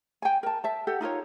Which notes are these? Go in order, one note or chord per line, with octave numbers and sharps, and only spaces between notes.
G5 G#5
A#4 A5
E5 A5
G4 A4 F#5
D#4 F4 A#4 C#5